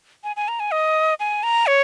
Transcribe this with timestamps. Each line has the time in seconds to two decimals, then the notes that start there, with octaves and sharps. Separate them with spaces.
0.24 G#5
0.36 G#5
0.48 A#5
0.60 G#5
0.71 D#5
1.20 G#5
1.43 A#5
1.67 C#5